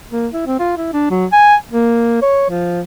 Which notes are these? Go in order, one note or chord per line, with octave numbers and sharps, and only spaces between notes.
A#3
E4
C4
F4
E4
D4
F#3
G#5
A#3
C#5
F3